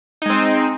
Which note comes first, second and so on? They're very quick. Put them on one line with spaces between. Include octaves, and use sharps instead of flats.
D#4 G#3 C4